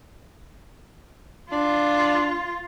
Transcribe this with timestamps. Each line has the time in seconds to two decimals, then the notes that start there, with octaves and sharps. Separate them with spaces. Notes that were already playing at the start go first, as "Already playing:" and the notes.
1.52 D4 F4